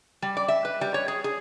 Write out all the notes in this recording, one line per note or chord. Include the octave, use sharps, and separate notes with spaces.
G3
D5
E5
B4
G3
C#5
G#4
G#4